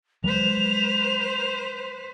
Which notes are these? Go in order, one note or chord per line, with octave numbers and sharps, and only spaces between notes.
F#3 G#3 B4 C5 F7